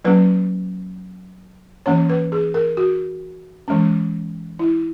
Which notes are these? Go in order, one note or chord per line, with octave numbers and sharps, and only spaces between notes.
F#3 A#3 C#4 B4
E3 A#3 C#4 C#5
B4
G#4
A#4
F#4
E3 G#3 C#4
E4